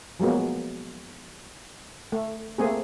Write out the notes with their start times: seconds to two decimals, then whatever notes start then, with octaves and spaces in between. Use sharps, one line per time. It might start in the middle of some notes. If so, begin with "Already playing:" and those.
0.20 F3 F#3 G#3 A#3 B3
2.12 A3
2.58 A3 A#3 C4 G#4